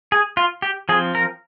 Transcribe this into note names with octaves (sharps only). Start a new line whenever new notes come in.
G#4
F4
G4
F3 C4 G#4
A#4